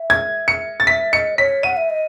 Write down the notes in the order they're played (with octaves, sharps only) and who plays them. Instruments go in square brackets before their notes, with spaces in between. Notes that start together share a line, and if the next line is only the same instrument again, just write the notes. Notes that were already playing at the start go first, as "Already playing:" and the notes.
Already playing: [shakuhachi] E5
[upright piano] G#6
C#7
A6
[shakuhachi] E5 [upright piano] B6
[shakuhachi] D#5 [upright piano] C#7
[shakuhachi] C#5 [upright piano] B6
[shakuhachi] F#5 [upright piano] D#7
[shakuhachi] E5
D#5